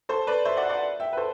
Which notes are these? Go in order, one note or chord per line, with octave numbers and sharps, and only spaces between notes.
A4 C5
B4 D5
C5 E5
D5 F#5
D5 F#5
E5 G5
B4
A4 C5